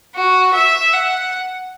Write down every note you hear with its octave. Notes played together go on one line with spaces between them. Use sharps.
F#4
E5
F#5